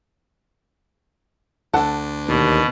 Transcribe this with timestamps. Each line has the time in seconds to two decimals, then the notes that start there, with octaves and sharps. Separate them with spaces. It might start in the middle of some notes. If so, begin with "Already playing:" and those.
1.74 D2 D4 A4 F#5
2.28 D#2 B2